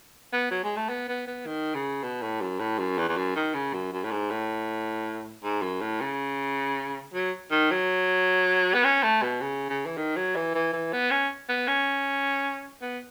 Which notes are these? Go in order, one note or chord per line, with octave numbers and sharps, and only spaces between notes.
B3
F#3
G#3
A3
B3
B3
B3
D#3
C#3
B2
A2
F#2
A2
F#2
E2
E2
F#2
D#3
C#3
F#2
F#2
A2
G#2
A2
G#2
F#2
A2
C#3
F#3
D#3
F#3
B3
C#4
A3
B2
C#3
C#3
E3
D#3
F#3
E3
E3
E3
B3
C#4
B3
C#4
B3